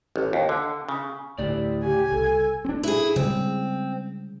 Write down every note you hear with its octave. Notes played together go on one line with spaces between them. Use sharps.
A1
D#2
D3
C#3
D2 A2 E4 G4 D5
C#3 G4 G#5
C2 A4
C4 D4
E4 G#4
C#3 G3 G#3 C4